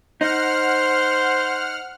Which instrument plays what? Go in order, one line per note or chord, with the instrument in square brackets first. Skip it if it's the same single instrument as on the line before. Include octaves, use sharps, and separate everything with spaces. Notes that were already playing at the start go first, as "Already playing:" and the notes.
[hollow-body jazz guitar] D#4 [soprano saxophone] C5 [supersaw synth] F#5 F6